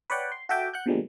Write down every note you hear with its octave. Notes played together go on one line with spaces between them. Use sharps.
B4 C#5 D5 F#5 G5
C6
F#4 A4 E5 G5 D6
F#5 F#6 G6
B2 D3 F3 G3 G#3 A#3